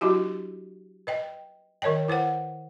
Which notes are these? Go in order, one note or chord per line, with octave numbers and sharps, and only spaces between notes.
F#3 D4 E4 F#4 G4
B4 D#5 G5
D#3 A#4 C#5 D#5 G5
E4 B4 C5 F#5